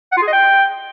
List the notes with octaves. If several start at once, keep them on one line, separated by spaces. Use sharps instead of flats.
F#5
F4
G#4
D#5
G5